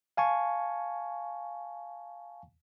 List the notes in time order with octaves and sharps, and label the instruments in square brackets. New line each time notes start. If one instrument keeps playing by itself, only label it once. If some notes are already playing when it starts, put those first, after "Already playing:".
[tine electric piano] F5 G#5 A5 C#6